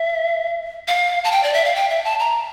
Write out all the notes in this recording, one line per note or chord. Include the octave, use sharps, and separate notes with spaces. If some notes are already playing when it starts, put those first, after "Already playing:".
Already playing: E5
F5
A5
G5
D5
E5
F5
G5
E5
A5
A#5